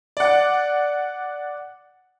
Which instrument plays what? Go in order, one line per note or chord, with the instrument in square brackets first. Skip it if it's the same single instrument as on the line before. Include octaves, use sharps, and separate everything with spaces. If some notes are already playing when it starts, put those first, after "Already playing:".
[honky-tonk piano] D5 F#5